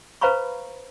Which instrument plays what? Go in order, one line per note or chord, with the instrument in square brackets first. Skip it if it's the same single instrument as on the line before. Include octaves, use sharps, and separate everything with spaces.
[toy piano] B4 C5 F5 A#5 B5 C#6